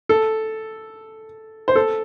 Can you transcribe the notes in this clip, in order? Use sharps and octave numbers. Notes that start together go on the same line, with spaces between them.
A4
C5
A4